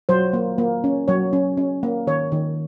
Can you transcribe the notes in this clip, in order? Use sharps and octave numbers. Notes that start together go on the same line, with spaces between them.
F#3 C5
A#3
A#3
C#4
F#3 C#5
C#4
C#4
A#3
D#3 C#5
D#3